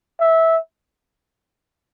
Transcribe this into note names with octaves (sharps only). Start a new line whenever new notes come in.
E5